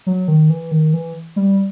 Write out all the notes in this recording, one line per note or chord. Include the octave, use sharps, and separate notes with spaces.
F#3
D#3
E3
D#3
E3
G3